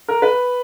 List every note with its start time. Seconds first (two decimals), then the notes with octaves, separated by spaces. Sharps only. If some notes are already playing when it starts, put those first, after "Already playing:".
0.08 A#4
0.22 B4